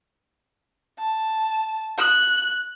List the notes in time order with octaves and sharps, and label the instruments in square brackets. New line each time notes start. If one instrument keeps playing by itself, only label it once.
[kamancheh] A5
F#6